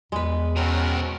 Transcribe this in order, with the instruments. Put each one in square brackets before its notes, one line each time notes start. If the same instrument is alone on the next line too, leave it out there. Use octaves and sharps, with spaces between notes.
[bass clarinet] E2 [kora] G#3 B4
[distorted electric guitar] B2 A#4 [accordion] C4 C#4 F#4